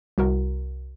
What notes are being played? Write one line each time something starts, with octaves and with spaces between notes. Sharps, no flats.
C2 F#4 A#4